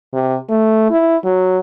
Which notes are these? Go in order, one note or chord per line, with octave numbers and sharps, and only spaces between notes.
C3
A3
E4
F#3